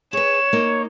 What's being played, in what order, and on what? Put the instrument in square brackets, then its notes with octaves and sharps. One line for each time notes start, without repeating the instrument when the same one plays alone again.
[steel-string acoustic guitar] G#4 B4 [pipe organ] C#5 [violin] E7
[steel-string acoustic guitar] A#3 D#4